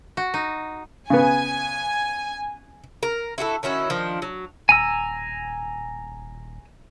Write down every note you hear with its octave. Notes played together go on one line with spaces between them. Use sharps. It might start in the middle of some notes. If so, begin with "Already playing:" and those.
F#4
D#4
C#3 B3 G#5
A#4
E4 F#4 G#4 A4
D#3 C#4 E4 F#4
D#3 F3 D4
F#3
D#1 G#5 A#5 E6